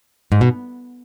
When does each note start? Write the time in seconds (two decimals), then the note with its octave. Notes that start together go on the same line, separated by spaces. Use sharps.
0.32 G#2
0.41 B2